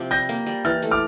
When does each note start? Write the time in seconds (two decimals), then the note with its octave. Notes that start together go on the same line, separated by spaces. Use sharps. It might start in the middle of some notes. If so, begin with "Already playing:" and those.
Already playing: C3 F3
0.11 G3 G6 A#6
0.29 A#3
0.46 G3
0.65 E3 F6 A6
0.82 A3
0.91 D6 F6